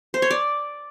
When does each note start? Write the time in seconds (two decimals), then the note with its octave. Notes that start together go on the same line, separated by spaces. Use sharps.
0.14 C5
0.22 C#5
0.31 D5